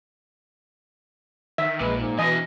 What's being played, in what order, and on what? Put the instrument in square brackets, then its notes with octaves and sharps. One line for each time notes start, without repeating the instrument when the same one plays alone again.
[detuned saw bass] D#3 [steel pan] E5
[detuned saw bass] A#1 [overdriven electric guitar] A#2 [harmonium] G#3 B4
[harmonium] G#2
[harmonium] B2 [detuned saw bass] E3 [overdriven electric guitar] D4 G#5 [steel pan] D#5